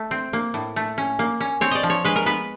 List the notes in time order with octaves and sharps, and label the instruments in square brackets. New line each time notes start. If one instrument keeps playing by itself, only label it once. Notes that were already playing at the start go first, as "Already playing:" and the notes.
Already playing: [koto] A3
C4
A#3
A2
A3
C#4
A#3
C#4
C4 C#5
D5 D#5
F3
C#5
G#3 B4
A#4
B3 B4